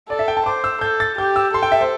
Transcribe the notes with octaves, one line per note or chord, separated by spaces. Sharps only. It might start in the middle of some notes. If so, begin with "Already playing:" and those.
A4 D5
E5
G5
A5
C5 D6
E6
A4 G6
A6
G4 G6
E6
A4 C6
G5
E5
C5